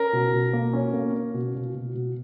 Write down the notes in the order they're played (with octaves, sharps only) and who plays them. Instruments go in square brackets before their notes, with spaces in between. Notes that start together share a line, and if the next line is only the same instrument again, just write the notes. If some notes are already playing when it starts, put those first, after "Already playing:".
Already playing: [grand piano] C#4 [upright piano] A#4
[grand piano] B2
B2
A#3
C#4
A#3
C#4
B2
B2
B2
B2